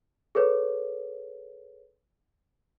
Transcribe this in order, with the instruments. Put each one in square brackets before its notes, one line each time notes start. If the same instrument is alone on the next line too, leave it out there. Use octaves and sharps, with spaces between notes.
[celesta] G#4 A4 B4 C#5